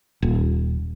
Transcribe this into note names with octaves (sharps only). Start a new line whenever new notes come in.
D#1